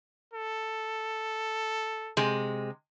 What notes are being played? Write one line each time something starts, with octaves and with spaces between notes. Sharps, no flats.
A4
C3 G#3